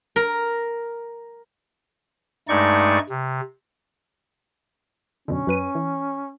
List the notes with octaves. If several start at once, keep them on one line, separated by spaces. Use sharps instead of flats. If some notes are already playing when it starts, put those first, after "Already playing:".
A#4
G2 G#3 A3 D#4 D5 C#6
C3
F#2 B2 D3 C#4
F#2 B4 D#7
E3